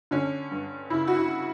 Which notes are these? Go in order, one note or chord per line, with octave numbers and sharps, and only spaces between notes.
D3 C#4
G2
C#3 E4
F#4
E4